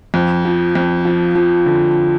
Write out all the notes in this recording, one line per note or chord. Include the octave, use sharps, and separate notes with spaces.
F2
F3
F2
F3
F3
D3